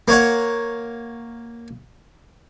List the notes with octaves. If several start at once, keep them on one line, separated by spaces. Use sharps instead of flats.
A#3 C#5 F#5